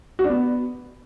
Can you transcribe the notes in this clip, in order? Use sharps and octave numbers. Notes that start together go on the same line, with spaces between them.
F#4
D4
B3